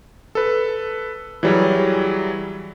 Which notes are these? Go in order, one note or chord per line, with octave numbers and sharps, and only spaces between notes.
A4 B4
E3 F#3 G3 G#4 C#5